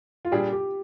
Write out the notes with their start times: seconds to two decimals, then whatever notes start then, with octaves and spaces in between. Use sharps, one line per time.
0.25 F4
0.32 A#2 G3 D4 G4 G#4
0.53 G4